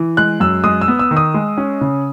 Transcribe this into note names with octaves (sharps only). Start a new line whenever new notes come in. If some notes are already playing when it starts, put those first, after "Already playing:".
Already playing: E3
G#3 F#6
F#2 E6
G#3 D#6
E6
B3
E6
D#3
D#6
G#3
C#4
C#3